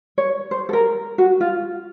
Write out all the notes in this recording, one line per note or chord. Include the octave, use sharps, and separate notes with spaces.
C#5
C5
A4
A#4
F#4
F4